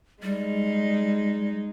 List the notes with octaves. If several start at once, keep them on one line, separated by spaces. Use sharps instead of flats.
G3 G#3 D#4